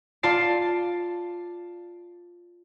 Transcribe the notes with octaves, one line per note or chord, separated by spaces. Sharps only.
F4 D5 A5 C7